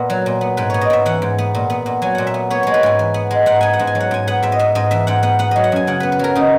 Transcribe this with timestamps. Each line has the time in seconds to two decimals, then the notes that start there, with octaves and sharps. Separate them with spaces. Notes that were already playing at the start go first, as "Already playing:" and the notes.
Already playing: A#2 B3
0.10 F#3
0.26 A#2
0.41 B3
0.57 G#2 B4
0.70 B3 C#5
0.81 D#5
0.90 G#2 E5
1.06 E3 F#5
1.22 G#2
1.38 B3
1.55 A#2
1.70 B3
1.86 A#2
2.02 F#3 G#5
2.15 A#2 F#5
2.27 E5
2.34 B3
2.50 B3 C#5
2.63 G#3 C#5
2.74 B4
2.83 G#2 G#5
2.99 E3
3.14 B3
3.31 G#3
3.46 G#2 F#5
3.61 B3 G#5
3.73 F#5
3.79 G#2
3.87 G#5
3.95 F#3
4.00 F#5
4.11 G#2 G#5
4.27 B3 F#5
4.43 G#2 E5
4.52 D#5
4.59 B3 E5
4.75 G#2 D#5
4.91 E3 E5
5.07 G#2 F#5
5.23 B3 F#5
5.39 B3 F#5
5.51 F#3 D#5
5.64 F#5
5.72 F#2 G#5
5.87 C#3 F#5
6.00 B3 B4
6.12 B4
6.19 F#3 A#4
6.35 C#3 D#4